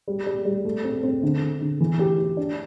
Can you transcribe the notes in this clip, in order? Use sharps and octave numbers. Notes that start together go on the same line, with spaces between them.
G3
G3
G3
A3
C4
C4
D3
D3
D3
E3
G4
G4
D4